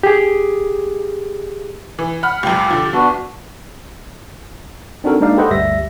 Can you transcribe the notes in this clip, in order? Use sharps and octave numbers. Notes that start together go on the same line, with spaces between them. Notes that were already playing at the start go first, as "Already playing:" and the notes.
G4 G#4
E3
F#5 B5 F6
C#2 F#2 G4
D3 F3
C2 B3 D4 F#4
C4 D4 D#4 F#4 A4 A#4
G#3 A#3 D4 D#4 D5 F5
G4 A4 B4 C5 D#5 F#5
G1 D2 G3 E5 A#6